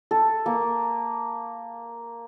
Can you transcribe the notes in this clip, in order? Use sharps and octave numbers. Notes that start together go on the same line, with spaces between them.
A4
A#3